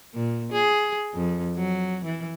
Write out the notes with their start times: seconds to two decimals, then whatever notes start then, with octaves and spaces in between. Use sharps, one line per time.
0.14 A#2
0.52 G#4
1.15 F2
1.57 F#3
2.05 E3